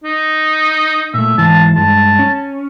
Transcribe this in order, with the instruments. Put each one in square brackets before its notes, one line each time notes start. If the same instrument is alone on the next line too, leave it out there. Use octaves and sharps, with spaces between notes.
[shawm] D#4
[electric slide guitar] A#2 A3 [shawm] E5
[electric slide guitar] G#2 E3 [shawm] A5
[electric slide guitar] G2 G#3 [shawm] A5
[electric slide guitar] C#4